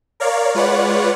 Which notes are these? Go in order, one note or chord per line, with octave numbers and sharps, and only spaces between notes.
A#4 C#5 D5 F5
G#3 F4 B4 C#5 D5 F#5